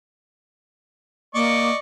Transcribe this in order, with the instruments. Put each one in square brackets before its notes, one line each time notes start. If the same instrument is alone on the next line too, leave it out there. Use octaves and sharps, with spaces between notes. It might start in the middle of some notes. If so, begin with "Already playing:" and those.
[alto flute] A#3 [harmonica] D5 D#5 C#6